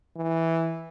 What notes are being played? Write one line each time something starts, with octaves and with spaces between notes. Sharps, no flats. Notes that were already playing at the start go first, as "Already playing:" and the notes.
E3